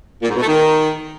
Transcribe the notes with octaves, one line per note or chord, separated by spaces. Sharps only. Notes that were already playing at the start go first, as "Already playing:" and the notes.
A#2
G#2
B2
A3
D#3